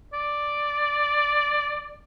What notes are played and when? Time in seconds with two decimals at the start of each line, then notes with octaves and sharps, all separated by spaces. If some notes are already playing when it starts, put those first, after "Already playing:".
0.13 D5